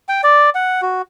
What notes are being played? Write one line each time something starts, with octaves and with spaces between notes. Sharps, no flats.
G5
D5
F#5
F#4